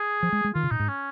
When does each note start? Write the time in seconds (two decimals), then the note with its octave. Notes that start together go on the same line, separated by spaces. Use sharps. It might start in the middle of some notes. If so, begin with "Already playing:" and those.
Already playing: G#4
0.23 F3
0.33 G#3
0.44 G#3
0.55 D#3 F4
0.63 C#3
0.71 A#2 D#4
0.80 G#2
0.88 C#4